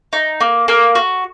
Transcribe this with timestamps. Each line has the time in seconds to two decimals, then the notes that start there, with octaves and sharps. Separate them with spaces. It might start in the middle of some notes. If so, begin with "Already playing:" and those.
0.13 D#4
0.41 A#3
0.68 A#3
0.95 F#4